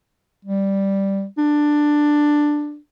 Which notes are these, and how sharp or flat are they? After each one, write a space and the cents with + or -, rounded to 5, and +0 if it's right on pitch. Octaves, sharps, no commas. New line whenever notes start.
G3 +0
D4 +10